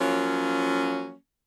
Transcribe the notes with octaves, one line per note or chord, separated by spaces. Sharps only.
F3 F#3 A#3 C#4